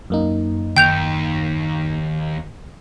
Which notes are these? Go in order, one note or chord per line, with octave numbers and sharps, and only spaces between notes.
F#2 A#3 D#4
D#2 G5 G6 F7